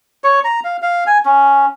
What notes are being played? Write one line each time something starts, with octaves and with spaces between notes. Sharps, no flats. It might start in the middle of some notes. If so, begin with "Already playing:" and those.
C#5
A#5
F5
F5
G#5
C#4